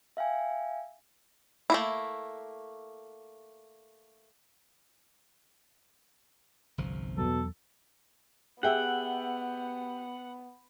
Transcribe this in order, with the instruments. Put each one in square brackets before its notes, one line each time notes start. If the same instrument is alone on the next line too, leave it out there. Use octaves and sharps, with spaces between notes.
[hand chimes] E5 F5 G5 G#5
[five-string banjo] A3 A#3 E4
[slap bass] G1 C2 F3
[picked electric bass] E2 F#3 [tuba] B2 [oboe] A4
[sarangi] B3 [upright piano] G4 G5 E6 [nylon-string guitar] G#4 E5 [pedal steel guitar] F#5